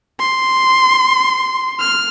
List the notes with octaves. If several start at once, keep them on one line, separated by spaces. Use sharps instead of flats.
C6
F6